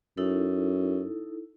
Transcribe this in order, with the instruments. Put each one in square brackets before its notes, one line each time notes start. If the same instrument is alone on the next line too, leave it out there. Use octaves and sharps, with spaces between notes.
[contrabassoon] F#2 [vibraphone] D#4 E4 A4